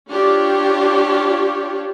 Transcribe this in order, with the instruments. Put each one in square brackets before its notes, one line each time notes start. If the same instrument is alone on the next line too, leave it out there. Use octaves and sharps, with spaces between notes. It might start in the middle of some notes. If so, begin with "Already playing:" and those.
[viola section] D4 F4 G4 C#5